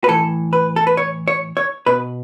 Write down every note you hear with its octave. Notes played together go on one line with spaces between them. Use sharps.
B4
A2 E3 A4
B4
A4
B4
C#5
C#5
C#5
B2 B4